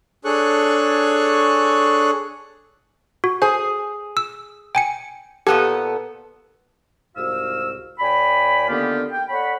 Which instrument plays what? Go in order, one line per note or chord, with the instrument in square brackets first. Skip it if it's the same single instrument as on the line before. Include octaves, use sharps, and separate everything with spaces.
[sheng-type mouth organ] D4 G#4 A4 C#5 C#6 F#6
[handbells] F#4
[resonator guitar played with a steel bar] G#4 [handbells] C5
[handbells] E6
G5 G#5 C#7
[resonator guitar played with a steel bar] A#2 B3 A4 [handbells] G4
[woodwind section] C2 G#2 F#4 C5 F5 E6
D#2 D5 G5 G#5 B5
D3 D#3 A#3 B3 F4 G4
G5
A4 C#5 D5 F#5 B5